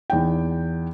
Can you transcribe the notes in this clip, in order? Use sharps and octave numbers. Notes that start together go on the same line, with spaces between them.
E2 D#4 G5